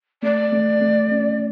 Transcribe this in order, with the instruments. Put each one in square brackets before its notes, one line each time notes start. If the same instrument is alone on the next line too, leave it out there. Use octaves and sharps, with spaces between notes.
[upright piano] A3 [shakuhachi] D5
[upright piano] A3
A3
C#4